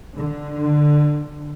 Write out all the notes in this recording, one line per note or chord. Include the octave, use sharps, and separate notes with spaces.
D3